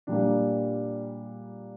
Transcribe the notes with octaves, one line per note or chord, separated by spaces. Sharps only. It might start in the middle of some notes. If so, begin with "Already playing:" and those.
A#2 G3 A#3 D4